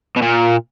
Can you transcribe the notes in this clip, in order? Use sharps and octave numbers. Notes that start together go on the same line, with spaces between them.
B2
A#2